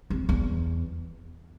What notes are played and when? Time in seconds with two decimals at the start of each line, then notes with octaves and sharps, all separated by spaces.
0.10 F2
0.29 E2